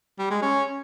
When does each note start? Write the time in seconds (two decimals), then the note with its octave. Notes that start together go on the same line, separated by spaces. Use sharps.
0.19 G3
0.30 G#3
0.42 C#4